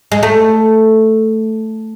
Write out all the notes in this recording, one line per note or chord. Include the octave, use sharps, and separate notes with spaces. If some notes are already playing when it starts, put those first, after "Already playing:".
G#3
A3